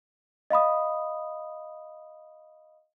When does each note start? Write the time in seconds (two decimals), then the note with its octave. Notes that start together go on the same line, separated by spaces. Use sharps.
0.50 D#5 F5 B5 D#6